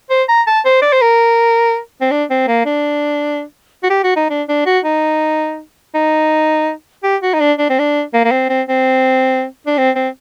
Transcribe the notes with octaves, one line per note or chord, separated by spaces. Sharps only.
C5
A#5
A5
C5
D5
C5
A#4
C4
D4
C4
A#3
D4
F#4
G4
F#4
D#4
D4
D4
F#4
D#4
D#4
G4
F#4
D#4
D4
D4
C4
D4
A#3
A#3
C4
C4
C4
D4
C4
C4